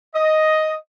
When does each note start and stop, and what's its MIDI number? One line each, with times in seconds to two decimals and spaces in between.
0.14 0.75 75